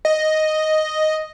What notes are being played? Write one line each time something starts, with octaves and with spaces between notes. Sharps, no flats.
D#5